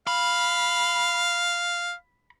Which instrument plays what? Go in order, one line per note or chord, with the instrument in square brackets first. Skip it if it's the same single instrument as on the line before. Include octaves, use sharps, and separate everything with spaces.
[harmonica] F5 [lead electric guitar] B5